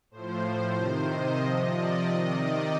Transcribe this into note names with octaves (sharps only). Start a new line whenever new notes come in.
A2 F3 C5
C5
C3 D#3
D#5
C3 F3
D5
C3 D#3 D#5
D5